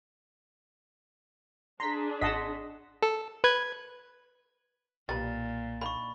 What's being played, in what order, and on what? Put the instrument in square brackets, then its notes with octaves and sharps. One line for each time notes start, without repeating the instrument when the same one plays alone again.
[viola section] D4 G#4 [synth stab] A#5 B6 [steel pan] C6
[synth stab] G#1 C6 B6 [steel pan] D#5 F#5 A5
[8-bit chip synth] A4
B4 G#6
[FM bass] B1 [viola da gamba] A#2 [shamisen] G3 D#4 B4 [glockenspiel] A6
[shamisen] A#3 D4 D#4 [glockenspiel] B5 C#6